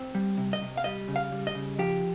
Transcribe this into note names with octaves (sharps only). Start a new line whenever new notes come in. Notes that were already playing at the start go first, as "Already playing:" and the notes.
Already playing: C4
G3
C3
D#5
C3
F5
G3 D#5
C#3
F5
G3
D#5
C#3
F3 G4